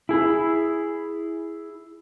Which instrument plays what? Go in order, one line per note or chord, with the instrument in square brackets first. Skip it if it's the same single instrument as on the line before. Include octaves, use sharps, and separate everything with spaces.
[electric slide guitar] E4 G#4